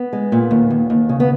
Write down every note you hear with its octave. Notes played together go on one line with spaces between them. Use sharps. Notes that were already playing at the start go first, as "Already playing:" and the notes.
Already playing: B3
G#3
A#2
D#2
D#2
D#2
C#3
B3